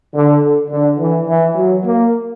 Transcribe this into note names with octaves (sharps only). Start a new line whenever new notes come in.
D3
D3
E3
E3
F#3
A#3